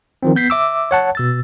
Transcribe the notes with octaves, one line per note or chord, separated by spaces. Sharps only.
D#3 F3 C4
B3 G6 B6 C7
E5 D6 E6
C#5 F#5 A5
B2 E6 A6